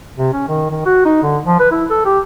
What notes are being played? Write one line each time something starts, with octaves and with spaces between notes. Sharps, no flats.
C3
C#4
D#3
D#3
F#4
D#4
D3
F3
B4
E4
A4
G4